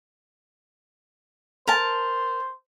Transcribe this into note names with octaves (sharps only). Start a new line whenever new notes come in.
A#4 C5 A5